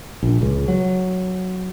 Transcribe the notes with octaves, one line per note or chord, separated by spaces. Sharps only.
A#1
C#2
F#3